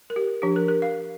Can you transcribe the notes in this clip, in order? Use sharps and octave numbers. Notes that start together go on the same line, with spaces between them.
A#4
G4
F3 D4 G4
A#4
A#4
F5